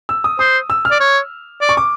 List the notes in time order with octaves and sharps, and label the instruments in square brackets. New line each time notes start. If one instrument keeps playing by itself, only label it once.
[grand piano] E6
D#6
[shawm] C5 [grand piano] D#6
[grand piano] E6
F6
[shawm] D5
C#5
D5
[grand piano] C#6
D6